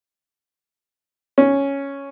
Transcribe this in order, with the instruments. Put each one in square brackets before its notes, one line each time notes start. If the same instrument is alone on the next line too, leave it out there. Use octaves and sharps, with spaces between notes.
[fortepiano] C#4